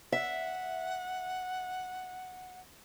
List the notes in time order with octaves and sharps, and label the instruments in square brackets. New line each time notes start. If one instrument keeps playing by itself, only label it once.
[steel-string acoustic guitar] E5 [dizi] F#5